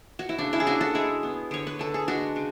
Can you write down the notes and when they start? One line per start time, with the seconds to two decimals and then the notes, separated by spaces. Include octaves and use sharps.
0.19 F#4
0.29 E4
0.38 C#3 D4
0.53 C#4 E4
0.60 G#4
0.66 C#3 D4 F#4
0.81 F#4 A4
0.94 G#3 E4 G#4
1.23 B3
1.51 D3 C#5
1.67 B4
1.79 D3 A4
1.94 G#4
2.08 G#3 D4 F#4
2.36 C#3